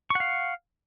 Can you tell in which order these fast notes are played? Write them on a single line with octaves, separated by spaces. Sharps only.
C#6 F#5 F5